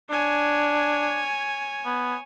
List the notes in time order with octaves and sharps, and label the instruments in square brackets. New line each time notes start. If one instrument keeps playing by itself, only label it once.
[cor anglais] D4 [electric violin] C#5 G#5
[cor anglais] B3